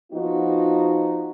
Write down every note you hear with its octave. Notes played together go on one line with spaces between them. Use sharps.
F3 B3 D#4 F4 F#4